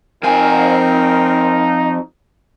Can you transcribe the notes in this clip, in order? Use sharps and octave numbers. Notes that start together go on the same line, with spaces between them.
F2 C4 D#4 F4 A#4 G#5